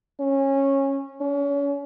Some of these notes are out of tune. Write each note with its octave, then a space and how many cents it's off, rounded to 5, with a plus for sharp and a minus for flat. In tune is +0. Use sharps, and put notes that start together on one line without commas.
C#4 -20
C#4 +35